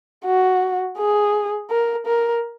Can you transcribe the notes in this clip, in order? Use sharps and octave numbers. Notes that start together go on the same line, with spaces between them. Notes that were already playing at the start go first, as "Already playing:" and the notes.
F#4
G#4
A#4
A#4